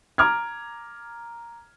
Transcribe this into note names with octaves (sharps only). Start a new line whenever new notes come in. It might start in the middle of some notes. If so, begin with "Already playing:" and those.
A#5 D6 F6 G#6